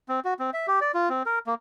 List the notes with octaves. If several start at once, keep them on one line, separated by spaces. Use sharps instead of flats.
C4
F#4
C4
E5
G4
D5
F4
C4
A#4
A#3